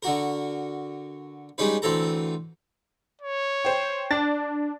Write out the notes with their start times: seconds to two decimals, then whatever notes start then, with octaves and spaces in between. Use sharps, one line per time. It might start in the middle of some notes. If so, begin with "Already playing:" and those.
0.03 D3 F#4 A#4
1.58 G3 G#3 C#4 D#4 B4
1.82 D2 E3 C4 A4 A#5
3.21 C#5
3.65 C5 G5
4.11 D4 A6